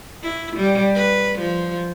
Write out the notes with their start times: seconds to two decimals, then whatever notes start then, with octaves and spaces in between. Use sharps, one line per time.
0.23 E4
0.56 G3
0.95 B4
1.39 F3